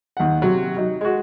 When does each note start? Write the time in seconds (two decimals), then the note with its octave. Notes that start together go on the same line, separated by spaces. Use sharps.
0.17 D#2 F#5
0.42 C3 F#3
0.77 F#3 D#4
1.01 G#3 F#4